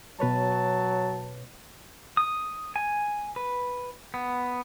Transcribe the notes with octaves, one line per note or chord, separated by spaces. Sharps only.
B2 F#3 B4 C#5 A5
D#6
G#5
B4
B3